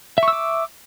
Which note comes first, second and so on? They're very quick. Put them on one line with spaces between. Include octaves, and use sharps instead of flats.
E5 C#6 E6 D6